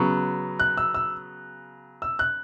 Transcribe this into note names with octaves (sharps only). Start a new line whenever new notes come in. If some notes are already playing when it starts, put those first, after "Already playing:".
Already playing: C#3 F#3 B3 C#6
F#6
E6
E6
E6
F#6